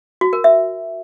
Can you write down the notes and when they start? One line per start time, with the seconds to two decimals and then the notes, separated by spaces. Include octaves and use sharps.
0.21 F#4
0.33 A#4
0.44 E5